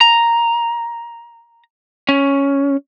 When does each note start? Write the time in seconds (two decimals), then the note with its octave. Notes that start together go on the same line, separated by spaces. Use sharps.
0.01 A#5
2.09 C#4